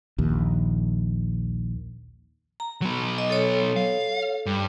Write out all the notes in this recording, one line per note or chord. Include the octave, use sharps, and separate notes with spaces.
A#1 D#2
A#5
F#3 B3
D#5
A4 C#5
F5
G2